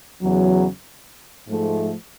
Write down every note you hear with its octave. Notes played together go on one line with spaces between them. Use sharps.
E2 C#3 F#3
G#2 F3 A3